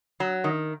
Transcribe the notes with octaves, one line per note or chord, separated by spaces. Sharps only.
F#3
D#3